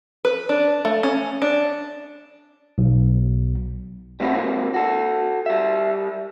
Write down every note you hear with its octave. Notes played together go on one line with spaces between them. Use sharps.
B4
D4
A3
C#4
D4
B1
G3 A3 B3 C4 E4 F#4
C3 E3 G#3 A#3 C4
F#4 A4
G3 E5